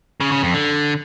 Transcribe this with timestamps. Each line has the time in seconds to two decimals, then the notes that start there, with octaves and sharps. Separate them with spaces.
0.20 C#3
0.32 C#3
0.43 F2
0.54 D3